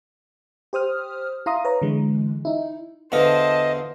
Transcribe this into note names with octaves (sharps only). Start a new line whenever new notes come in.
G4 C5 D#6 F6
E4 F5 A#5 C6 D#6
B4 C#5 A#5
D3 E3 G#3
D#4 E4
E2 D3 F4 B4 C5 D#5 A5